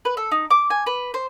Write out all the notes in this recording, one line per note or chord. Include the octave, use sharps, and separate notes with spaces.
B4
A4
D#4
D6
G#5
B4
C5